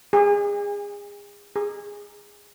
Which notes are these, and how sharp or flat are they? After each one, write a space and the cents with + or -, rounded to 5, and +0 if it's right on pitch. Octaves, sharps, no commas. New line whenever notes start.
G#4 -30
G#4 -15